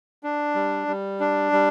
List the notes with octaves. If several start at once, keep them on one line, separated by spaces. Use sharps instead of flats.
D4
G3
G3
D4
G3